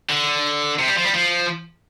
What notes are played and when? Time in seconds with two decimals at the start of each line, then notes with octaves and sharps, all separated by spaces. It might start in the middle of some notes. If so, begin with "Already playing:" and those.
0.09 D3
0.79 C3
0.87 G3
0.96 F3
1.05 G3
1.13 F3